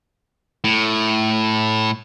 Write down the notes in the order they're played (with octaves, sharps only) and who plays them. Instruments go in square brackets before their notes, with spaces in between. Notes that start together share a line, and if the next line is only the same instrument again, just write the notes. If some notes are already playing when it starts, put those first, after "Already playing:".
[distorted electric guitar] A2